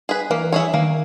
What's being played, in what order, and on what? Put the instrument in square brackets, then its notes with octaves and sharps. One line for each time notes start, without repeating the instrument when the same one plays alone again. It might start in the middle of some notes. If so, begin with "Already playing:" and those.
[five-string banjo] G#4 B4
[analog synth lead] E3 [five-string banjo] A#3
[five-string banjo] E4 G#4 C#5
[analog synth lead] D#3 [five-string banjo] A#3